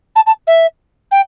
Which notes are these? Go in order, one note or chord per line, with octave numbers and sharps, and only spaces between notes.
A5
A5
E5
G5